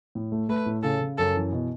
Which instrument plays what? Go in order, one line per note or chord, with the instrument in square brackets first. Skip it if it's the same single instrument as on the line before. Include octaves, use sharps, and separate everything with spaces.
[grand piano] A2
A3
[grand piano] A3 [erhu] B4
[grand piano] A2
[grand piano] C#3 [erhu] A4
[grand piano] C#3
[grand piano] F#2 [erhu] A4
[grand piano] E3
B2